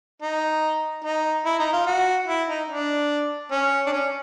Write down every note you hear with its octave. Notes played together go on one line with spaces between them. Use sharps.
D#4
D#4
E4
D#4
F4
F#4
E4
D#4
D4
C#4
D4
C#4